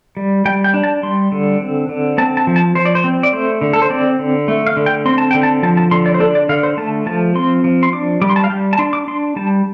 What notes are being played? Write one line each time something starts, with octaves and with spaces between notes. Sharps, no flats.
G3
G3 G5
G5
D4
A5
G3 C6
D3
C4
D3
C4 A5
A5
F3
A5
F3 C5
D5
C5
C4
D5
A3 C5
D3
A4
C5
C4 D5
D3
A3
F5
D3
G5
C4 C6
A5
D3 G5
A5
F3 A5
A5
D3 C6
D5
C5
D4 A4
D5
D3 F5
C5
A3 A5
F3 A5
C4 C6
F3
C6
D4 D6
G3 D6
C6
A5
F5
G3 G5
A5
D4 C6
D6
D4 C6
G3 A5